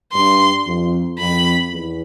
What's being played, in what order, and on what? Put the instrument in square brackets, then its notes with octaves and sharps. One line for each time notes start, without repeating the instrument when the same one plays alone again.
[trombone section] G2 [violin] C6
[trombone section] F2
[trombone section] F2 [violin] B5
[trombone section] E2